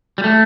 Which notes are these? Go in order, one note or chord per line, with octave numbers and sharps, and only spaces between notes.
G3
A3